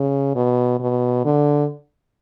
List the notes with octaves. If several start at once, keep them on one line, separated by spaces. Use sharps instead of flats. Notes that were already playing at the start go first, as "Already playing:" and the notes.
Already playing: C#3
B2
B2
D3